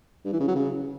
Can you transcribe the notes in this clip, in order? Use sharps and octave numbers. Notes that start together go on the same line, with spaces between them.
G2
E3
C#3
F#3
C#3